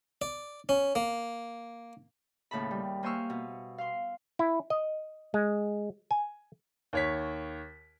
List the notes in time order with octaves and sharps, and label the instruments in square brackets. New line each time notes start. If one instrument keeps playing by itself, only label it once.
[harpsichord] D5
C#4
A#3
[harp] D#2 A2 C#3 A5 B5
G3
A#3 C5 G#5 C#6 E6 F6
B2
F5 C6
[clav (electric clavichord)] E4
D#5
G#3
G#5
[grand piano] D#2 C#5 B6